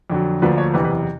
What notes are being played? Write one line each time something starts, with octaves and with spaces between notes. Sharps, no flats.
F2 D3 F#3
D2 D3 F3 A#3 D4 B4
C#5
F#1 E2 C3 E3 B4
B4